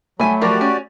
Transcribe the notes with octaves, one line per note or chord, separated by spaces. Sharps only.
F#3 G3 A3 G#5 B5
F3 F#3 F#4 G4 A#4 D5
C#4